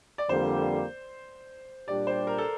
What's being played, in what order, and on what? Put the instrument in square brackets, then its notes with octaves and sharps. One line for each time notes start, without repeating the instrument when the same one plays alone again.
[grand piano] D5
[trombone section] F2 D3 G3 A#3 [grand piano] C5
[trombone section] A#2 G3 D4 G4 [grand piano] D5
[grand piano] C5
A#4
A4